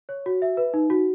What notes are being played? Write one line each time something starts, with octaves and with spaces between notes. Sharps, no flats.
C#5
F#4
E5
B4
D#4
F#4